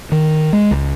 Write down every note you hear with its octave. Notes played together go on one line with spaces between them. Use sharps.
D#3
G#3
C#2